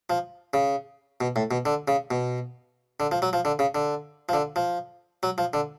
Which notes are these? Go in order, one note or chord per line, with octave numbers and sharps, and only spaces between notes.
F3
C#3
B2
A2
B2
D3
C#3
B2
D3
F3
F#3
F3
D3
C#3
D3
F3
D3
F3
F#3
F3
D3